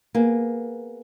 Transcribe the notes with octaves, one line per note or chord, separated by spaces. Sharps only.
A#3 B3 G#4